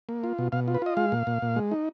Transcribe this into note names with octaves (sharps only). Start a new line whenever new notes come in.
A#3
F4
B2
B2 F5
F4
B4
F4 D#5
G#3 F5
A#2
A#2
A#2
G#3
D#4